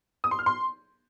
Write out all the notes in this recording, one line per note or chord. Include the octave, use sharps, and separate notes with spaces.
D#6
C6
F6
C6